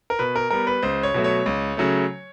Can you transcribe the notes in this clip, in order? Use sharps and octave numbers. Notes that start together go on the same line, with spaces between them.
A#4
B2 B4
A#4
G3 B3 A#4
B4
C#2 C5
C#5
B2 F#3 A3
C#5
C#2
C#3 F#3 A3